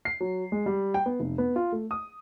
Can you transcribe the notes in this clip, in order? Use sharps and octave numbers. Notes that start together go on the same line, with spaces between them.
C7
F#3
G#3
G3
G5
B3
F1
B3
F4
A3
D#6